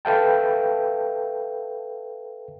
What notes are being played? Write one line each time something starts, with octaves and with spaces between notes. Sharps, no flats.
A4 B4 E5 F5 G5 A5